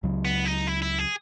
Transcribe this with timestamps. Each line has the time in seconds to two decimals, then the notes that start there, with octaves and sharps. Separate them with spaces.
0.03 C#2 C#3 F#3
0.25 B3
0.45 D#4
0.67 E4
0.82 E4
0.99 G#4